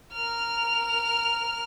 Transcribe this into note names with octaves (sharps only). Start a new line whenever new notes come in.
A#4 F6